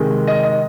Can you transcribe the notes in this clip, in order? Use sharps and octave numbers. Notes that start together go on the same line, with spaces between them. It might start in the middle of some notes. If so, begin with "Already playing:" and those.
Already playing: C3 D#3 G#3
D#5
D#5